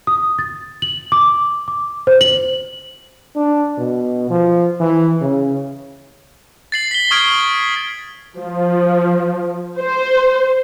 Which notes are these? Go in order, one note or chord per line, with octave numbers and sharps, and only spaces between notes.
D#6
A6
F#7
D6
D6
C5
F#7
D4
B2
F3
E3
C#3
A6 C7 F#7
B6 G7
C#6 D#6 F6 G#6 D7
F3
C5